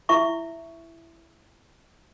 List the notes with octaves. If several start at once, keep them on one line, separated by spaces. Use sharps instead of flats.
E4 E5 C#6